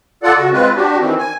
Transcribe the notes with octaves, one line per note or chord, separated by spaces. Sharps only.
F4 A4 D5 F#5
C#3 F#4
G#3 C4 F4 B4
D4 F#4 G4
D#3 E3 C4
G#5